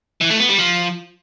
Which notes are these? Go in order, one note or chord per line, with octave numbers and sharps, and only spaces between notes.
E3
A3
B3
G3
F3